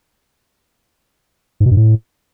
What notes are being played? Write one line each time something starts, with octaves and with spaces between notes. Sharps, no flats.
G#2
B2
G2
A2